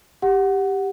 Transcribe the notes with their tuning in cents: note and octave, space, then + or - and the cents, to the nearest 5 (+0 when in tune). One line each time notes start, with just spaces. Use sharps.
G4 +0 F#5 +0